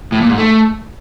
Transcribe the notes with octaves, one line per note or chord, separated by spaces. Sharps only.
A2
A#2
G#2
A3